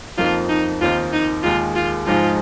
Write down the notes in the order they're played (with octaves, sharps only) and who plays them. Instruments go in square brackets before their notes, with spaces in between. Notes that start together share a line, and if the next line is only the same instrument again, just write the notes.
[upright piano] F2 F3 A#3 D#4 [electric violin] F4
[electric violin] D#4
[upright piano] D#2 D#3 C4 D#4 [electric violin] F4
[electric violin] D#4
[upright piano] D#2 D#3 G#3 D#4 [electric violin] F4
[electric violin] F4
[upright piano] G#2 F3 G#3 D#4 [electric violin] F4